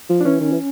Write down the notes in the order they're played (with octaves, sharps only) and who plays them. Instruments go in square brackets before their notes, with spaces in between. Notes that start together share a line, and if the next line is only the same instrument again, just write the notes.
[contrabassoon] F3
[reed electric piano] D4
[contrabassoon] E3 [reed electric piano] C#4
[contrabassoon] D#3
E3